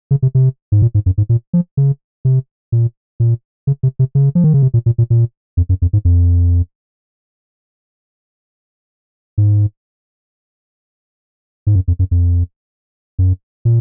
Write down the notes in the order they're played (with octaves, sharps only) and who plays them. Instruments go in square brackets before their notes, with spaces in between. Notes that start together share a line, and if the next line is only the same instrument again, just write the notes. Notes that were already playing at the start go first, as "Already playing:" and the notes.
[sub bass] C#3
C3
C3
G#2
A#2
G#2
F#2
G#2
A#2
F3
C#3
C3
A#2
A#2
C#3
C3
C3
C#3
F3
D#3
C#3
C3
A#2
A#2
A#2
A#2
F2
F#2
F2
G#2
F2
G#2
G#2
F#2
F2
F#2
F2
F#2
A#2